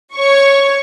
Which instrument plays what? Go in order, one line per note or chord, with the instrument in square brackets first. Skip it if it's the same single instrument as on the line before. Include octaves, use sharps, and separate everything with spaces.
[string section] C#5 C#6